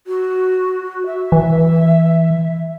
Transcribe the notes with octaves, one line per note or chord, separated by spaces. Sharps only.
F#4
E5
E3